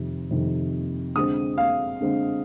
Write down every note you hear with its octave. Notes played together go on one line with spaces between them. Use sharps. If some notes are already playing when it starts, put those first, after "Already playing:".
Already playing: F2 C3 D#3
F2 C3 D#3
D3 G#3 C4 D#6
F5
D3 G#3 C4